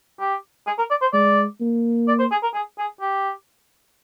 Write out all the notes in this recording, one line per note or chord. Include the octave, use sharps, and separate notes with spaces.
G4
G#4
A#4
D5
C5
G#3 D5
A#3
D5
C5
G#4
A#4
G#4
G#4
G4